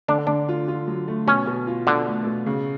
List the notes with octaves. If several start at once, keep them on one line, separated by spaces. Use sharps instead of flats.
D3 D4
D3 D4
F4
F4
F#3
A3
B2 C#4
B2
F4
B2 D3
A3
B2
C#3